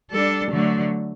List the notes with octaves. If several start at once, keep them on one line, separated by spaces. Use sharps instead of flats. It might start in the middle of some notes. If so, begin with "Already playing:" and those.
G3 D4 A4
D3 F#3 A3